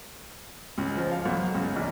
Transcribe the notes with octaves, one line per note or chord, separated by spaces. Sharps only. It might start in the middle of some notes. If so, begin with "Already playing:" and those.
C#2
F3
F5
B1
C#2
A#1